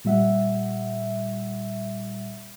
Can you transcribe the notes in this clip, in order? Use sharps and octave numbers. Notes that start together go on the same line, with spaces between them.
A#2 G3 E5 F#5